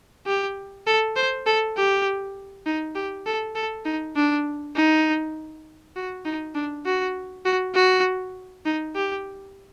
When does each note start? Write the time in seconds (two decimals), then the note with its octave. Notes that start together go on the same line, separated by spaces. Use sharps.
0.26 G4
0.87 A4
1.16 C5
1.46 A4
1.77 G4
2.66 D#4
2.95 G4
3.26 A4
3.55 A4
3.85 D#4
4.16 D4
4.76 D#4
5.96 F#4
6.25 D#4
6.55 D4
6.85 F#4
7.45 F#4
7.74 F#4
8.65 D#4
8.95 G4